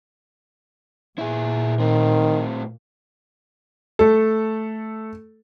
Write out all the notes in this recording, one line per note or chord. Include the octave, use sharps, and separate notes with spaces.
A#2 E4 G#4
A2 D#3 C4
A3 A4